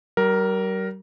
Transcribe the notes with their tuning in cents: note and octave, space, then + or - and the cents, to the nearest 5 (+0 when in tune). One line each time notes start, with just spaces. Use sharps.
G3 -40 A#4 +5